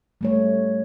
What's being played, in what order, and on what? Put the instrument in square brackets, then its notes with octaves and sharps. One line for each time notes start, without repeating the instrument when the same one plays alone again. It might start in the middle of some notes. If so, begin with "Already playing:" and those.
[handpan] G3 A3 C#5